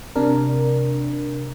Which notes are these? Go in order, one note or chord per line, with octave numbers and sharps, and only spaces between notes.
C3 D4 A#4